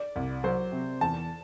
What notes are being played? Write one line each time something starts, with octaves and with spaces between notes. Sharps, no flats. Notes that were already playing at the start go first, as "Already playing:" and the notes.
Already playing: D5
C2
F#3 C5
C3
E2 A5